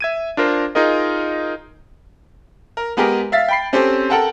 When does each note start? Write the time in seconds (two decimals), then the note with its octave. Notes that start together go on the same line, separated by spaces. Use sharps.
0.01 E5 G#6 D#7
0.37 D4 F4 A#4 C5
0.75 D#4 F4 G#4 A#4 D#5
2.77 A#4
2.97 G#3 B3 G4 G#4 A#4
3.32 E5 F5 A6 B6
3.48 G5 B5 C7
3.73 C4 C#4 G4 A4 C5
4.10 A4 A#4 F#5 G5 A5